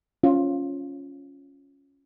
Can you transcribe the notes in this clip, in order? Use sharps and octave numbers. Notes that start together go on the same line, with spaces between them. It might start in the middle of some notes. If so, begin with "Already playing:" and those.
C#4 F4